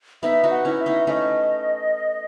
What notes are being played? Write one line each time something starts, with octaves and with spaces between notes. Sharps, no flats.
B3 D#4 E5
D#4 F#4
F#5
C#4 E4
E5
B3 D#4
A3 C#4 D#5 E5